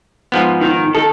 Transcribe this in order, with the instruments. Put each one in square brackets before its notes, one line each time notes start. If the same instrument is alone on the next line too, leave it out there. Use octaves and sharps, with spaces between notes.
[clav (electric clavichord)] G#2 F3 B3
[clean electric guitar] D#3
[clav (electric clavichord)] D#3 [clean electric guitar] A4